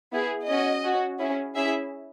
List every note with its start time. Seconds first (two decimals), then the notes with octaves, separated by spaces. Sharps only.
0.11 B3 E4 G#4
0.47 C#4 F#4 D#5
0.84 C#4 F#4
1.19 C#4 E4 G#4
1.55 C#4 E4 G#4 E5